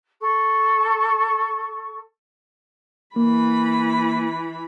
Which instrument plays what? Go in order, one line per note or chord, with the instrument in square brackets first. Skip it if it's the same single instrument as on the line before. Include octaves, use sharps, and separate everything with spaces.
[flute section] A4 C#6
[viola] E3 B5 [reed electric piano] A#3